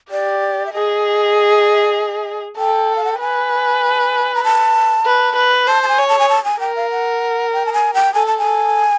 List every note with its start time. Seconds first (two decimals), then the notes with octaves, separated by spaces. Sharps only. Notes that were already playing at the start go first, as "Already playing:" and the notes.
0.11 G4 D5
0.66 E5
0.73 G#4 D#5
2.58 A4 G5
2.96 F5
3.04 F#5
3.12 G5
3.20 B4 G#5
4.35 A#5
4.44 A5
5.06 B4
5.36 B4
5.67 C5 A5
5.83 A5
5.88 G#5
5.98 C#5
6.08 A5
6.19 G#5
6.29 A5
6.44 G#5
6.60 A#4 G5
6.76 F5
6.91 F#5
7.53 G5
7.66 A5
7.73 G#5
7.94 G5
8.14 A4 G#5
8.27 A5
8.38 G#5
8.45 A4